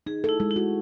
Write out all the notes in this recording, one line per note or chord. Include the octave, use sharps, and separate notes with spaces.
D#4 G#4
E4 A4
G#3
E4
F#4